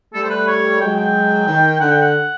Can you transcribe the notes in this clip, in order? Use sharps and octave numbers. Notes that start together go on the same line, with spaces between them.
G3 A3 A4
C5
B4
C#5
F#3 G#3 G5
G5
D#3
D3 F#5
G5
F#5